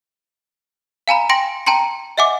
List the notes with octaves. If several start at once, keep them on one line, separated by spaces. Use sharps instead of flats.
F5 G#5 A#5 B5
G5 C6 A#6 D7
G5 A5 A#5 C6 C#7
D#5 E5 F#5 G#5 D6